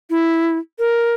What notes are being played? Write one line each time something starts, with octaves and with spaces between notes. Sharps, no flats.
E4
A#4